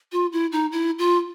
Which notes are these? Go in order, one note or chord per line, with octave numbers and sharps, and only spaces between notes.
F4
E4
D#4
E4
F4